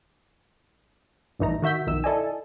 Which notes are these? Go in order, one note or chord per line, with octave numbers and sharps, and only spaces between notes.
A#1 G2 E3 A3 D#4 A#5
D#3 F#4 E5 G6 B6
B1 F2 D#3 E6
E4 A4 D5 D#5 G#5